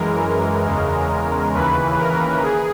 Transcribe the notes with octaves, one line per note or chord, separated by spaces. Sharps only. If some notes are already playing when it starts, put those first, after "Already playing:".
Already playing: F#2 E3 G#3 A#4
E2 C#3 G#3
D#2 C#3 E3 B4
A#4
G#4